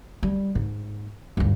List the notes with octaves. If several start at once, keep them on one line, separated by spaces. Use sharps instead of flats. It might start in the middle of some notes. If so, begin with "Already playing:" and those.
G3
G#2
D2 G2